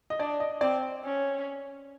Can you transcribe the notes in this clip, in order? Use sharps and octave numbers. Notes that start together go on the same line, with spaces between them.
D#5
D4 D5
D#5
C4 D5
C#4